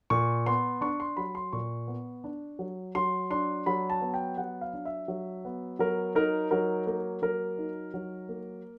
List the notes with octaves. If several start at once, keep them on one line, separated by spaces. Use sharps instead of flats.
A#2 C#6
B3 C6
D4 C#6
C6
F#3 B5
C6
A#2 C#6
B3
D4
F#3
F#3 C6
D4 C6
F#3 B5
A5
B3
G5
F#3 F#5
F5
D4
E5
F#3
B3
F#3 A#4
D#4 A#4
F#3 A#4
A#3 A#4
F#3 A#4
D#4
F#3
A#3